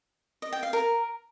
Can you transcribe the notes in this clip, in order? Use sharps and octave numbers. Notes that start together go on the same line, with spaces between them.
D#5
G5
F5
A#4